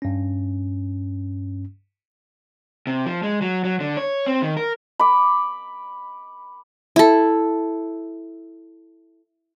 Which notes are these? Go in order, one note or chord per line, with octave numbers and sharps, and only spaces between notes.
G2 C#4
C3
F3
G#3
F#3
F#3
D3
C#5
C4
D#3
A#4
B5 D6
E4 A4